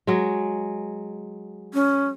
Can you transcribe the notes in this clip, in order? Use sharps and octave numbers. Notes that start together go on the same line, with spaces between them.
F#3 G#3
C#4